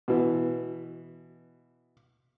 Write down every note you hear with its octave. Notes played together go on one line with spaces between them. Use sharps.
B2 E3